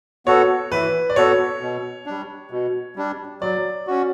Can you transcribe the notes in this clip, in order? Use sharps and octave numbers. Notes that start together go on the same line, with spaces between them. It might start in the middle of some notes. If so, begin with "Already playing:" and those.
B3 F#4 A4 C#5
E3 B4
D5
B3 F#4 A4 C#5
B2
G3 D4
B2
G3 D4
F#3 D5
C#4 F#4